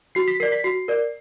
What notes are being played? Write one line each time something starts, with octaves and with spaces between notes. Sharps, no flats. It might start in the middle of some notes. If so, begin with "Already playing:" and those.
F#4 C7
B6
A#4 D5 C7
B6
F#4 C7
A#4 D5